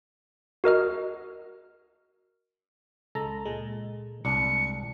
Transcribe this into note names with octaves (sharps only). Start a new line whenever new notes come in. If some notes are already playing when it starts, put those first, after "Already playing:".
F#4 A#4 D#5 F6
C#2 G#3 A4 A#5
A#2 G#3
C2 D4 C#7